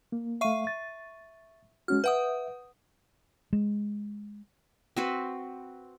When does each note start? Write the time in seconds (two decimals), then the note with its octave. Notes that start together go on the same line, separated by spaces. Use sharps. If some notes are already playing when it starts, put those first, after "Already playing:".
0.12 A#3
0.41 A3 E5 F5 C#6 D#7
0.67 A6
1.88 G#3 C#4 F#4 F6
2.04 B4 E5 F#5 D#6
3.53 G#3
4.96 C4 F#4 B4